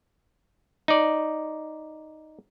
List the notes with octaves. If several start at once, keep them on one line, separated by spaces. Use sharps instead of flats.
D#4 D5